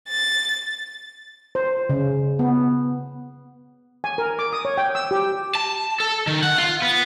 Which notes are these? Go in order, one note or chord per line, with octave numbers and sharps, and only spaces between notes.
A6
C5
C#3
B3
G#5
A#4
D6
D#6
C#5
G5
E6
G4
A5
A4
D#3
F#5
F4
B3